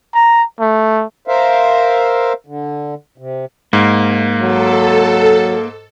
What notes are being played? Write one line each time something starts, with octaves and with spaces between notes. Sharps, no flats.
A#5
A3
A#4 C5 E5 F5
D3
C3
G#2 A#3
F#3 A4